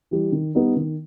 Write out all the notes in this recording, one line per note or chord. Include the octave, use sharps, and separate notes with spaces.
E3 G3
D#3
G3 B3 D#4
D#3